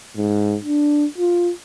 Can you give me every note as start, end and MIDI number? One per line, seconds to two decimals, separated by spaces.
0.17 0.56 44
0.65 1.05 62
1.18 1.51 65